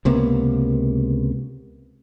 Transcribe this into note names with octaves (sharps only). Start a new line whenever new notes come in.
C#2 C3 A#3 B3